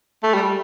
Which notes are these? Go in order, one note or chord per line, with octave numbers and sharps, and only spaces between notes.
A3
G3